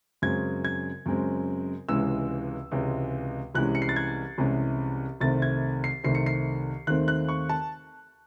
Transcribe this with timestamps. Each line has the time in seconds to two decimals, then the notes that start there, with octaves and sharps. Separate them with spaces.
0.22 F#2 C#3 G#3 C4 G#6
0.65 G#6
1.06 F#2 C#3 G#3 C4
1.89 C#2 C3 E3 G#3 C#4 E6
2.71 C#2 C3 E3 G#3 C#4
3.54 C2 C3 E3 G#3 C#4 F#6
3.75 C#7
3.82 C7
3.89 A6
3.96 G#6
4.38 C2 C3 E3 G#3 C#4
5.20 C2 C3 D#3 A3 C4 A6
5.42 G#6
5.84 C7
6.04 C2 C3 D#3 A3 C4 C7
6.15 C#7
6.26 C7
6.87 D#2 D#3 A3 C4 F#6
7.08 F#6
7.29 C#6
7.49 A5